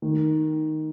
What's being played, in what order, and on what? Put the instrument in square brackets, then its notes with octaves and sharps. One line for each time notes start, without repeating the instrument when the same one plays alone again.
[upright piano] D#3